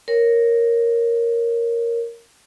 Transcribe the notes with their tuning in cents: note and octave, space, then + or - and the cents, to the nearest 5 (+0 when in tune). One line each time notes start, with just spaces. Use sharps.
A#4 +0 C#5 +0